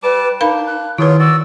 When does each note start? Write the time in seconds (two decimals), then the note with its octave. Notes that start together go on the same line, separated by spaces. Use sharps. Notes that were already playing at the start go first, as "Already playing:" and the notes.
0.03 G3 B4 A5 D6
0.41 D4 D#4 A#4 F5 B5
0.66 F#6
0.98 D#3 F#3 E4 F4 G#4 B4 C#5
1.19 F#4 D5 E6